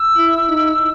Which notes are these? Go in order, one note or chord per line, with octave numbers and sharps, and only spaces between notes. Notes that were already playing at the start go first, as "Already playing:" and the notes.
Already playing: E6
E4
D#4